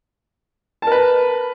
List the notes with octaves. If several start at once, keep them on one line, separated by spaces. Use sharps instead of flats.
A#4 B4 A5